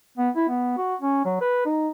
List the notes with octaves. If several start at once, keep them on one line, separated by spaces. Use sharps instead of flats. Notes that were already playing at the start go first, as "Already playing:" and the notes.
B3
E4
B3
F#4
C#4
F#3
B4
D#4